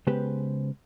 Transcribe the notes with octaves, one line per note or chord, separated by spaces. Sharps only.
C#3 G#3 B3 G4 B4 C5